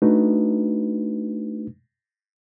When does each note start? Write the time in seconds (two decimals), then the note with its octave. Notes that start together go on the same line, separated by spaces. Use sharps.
0.02 A3 D4 D#4 F#4 B4